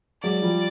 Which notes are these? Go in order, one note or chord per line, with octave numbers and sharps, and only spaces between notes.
F#3 G#3 D5
F3 G3